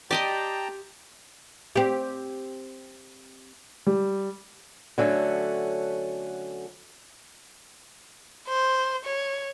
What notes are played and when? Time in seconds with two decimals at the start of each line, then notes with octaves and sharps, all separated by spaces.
0.11 G4 D5 D#5 G5 A5 A#5 C6
1.76 C4 G4
3.87 G3
4.98 D3 F#3 A3 C#4
8.49 C5
9.05 C#5